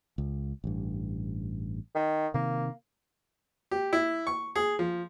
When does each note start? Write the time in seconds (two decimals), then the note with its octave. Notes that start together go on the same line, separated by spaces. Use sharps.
0.18 C#2
0.64 A1 G2
1.95 D#3
2.34 C3 D#3 A#3
3.71 G4
3.93 E4
4.27 C#6
4.56 G#4
4.79 F3